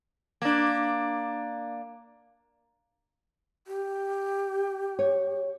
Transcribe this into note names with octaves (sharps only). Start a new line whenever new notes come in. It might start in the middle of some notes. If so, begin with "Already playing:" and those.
A#3 D4
G4
C#5